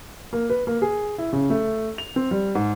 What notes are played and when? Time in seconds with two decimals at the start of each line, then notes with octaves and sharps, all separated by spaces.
0.33 A#3
0.50 B4
0.67 A#3
0.82 G#4
1.18 E4
1.33 C#3
1.50 A3
1.98 F7
2.16 C4
2.31 G3
2.55 G#2